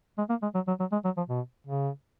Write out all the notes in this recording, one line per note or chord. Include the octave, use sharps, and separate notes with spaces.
G#3
A#3
G#3
F#3
F#3
F#3
G#3
F#3
F3
B2
C#3